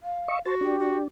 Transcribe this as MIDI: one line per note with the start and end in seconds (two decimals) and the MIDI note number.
0.03 0.40 77
0.28 0.39 75
0.28 0.39 76
0.28 0.39 85
0.45 0.79 66
0.45 0.55 72
0.45 0.55 81
0.61 1.08 62
0.61 1.01 67
0.79 0.98 66